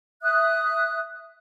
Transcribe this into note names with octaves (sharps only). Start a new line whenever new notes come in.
E5 D#6 F#6